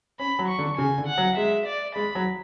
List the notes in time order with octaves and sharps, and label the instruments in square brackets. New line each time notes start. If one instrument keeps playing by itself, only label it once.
[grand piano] C#4 [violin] B5
[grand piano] F#3
[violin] C#6
[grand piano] D3
[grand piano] C#3 [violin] G#5
[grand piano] D3
[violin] F#5
[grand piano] F#3
[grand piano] G#3 [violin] E5
[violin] D5
[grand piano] G#3 [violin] B5
[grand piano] F#3